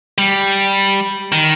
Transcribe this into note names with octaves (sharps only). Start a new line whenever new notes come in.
G3
D#3